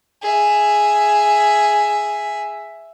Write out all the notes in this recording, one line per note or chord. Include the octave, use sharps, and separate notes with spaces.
G#4 E5